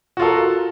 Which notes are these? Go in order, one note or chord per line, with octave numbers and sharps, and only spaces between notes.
F4 F#4 A4 A#4